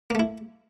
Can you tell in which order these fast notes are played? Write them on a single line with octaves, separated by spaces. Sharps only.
A#3 A3 E4